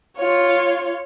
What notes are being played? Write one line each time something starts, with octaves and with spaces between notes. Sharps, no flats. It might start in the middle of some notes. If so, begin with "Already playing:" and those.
F4 C#5